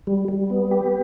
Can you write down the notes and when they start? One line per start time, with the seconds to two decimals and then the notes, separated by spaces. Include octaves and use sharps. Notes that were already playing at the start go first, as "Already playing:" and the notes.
0.07 G3
0.28 G3
0.50 B3
0.71 G4